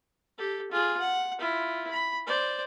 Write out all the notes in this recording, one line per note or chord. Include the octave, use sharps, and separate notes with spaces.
G4 A4
F4 G#4
F#5
E4 F4
B5
C5 D5